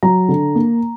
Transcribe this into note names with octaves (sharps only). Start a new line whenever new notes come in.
F#3 A#5
D3
A#3